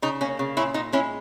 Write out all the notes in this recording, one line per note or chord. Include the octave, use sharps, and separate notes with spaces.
C#3 D#4
A#3 C#4
C#3
A#2 C#4 E4
A#2 D#4
G#3 C#4 E4